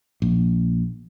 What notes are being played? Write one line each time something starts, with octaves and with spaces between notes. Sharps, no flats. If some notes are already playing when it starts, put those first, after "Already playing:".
A#1